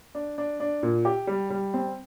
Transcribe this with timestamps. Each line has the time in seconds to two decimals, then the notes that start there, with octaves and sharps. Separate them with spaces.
0.15 D4
0.38 D4
0.60 D4
0.83 A#2
1.05 G4
1.27 G3
1.50 G3
1.74 C4